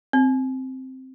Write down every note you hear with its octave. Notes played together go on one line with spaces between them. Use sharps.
C4